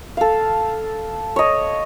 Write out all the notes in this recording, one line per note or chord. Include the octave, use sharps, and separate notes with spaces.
A4 F5
C#5 D#5